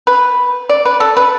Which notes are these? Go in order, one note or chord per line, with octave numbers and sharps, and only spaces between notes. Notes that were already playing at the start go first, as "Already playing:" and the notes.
B4
D5
B4
A4
B4